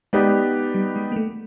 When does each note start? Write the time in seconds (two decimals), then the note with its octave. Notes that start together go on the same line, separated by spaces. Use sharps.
0.13 G#3 B3 D#4 G4 B4 D5
0.75 G3
0.96 G#3
1.12 A#3
1.16 A3